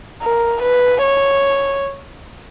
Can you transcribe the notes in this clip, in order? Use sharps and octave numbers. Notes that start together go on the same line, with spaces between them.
A#4
B4
C#5